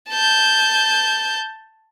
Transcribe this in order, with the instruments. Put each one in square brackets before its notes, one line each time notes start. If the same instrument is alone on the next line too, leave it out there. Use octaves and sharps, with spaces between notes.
[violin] A5 G6